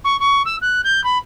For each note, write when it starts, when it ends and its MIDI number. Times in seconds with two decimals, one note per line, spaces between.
0.04 0.19 85
0.20 0.42 85
0.45 0.56 88
0.62 0.81 90
0.84 1.04 91
1.04 1.18 83